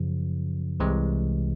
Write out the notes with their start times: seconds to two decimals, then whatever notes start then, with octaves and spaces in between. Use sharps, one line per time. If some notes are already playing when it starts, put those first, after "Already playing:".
Already playing: F#2 C#3 F3
0.80 C2 C3 E3 G#3